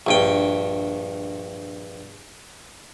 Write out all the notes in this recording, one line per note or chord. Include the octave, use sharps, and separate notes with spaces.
A#1 G2 G5